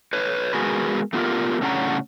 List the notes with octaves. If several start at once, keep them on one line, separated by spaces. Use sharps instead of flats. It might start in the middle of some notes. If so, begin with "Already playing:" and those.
B4 C#5
G#3 B3 F#4 G#4 A#4 B4
A3 B3 F4 G4 A#4
A2 C#3 C#4 D4 F#5 A#5